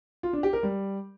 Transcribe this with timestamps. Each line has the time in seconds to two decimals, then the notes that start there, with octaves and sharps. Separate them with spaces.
0.23 F4
0.33 D4
0.43 G4
0.53 A#4
0.63 G3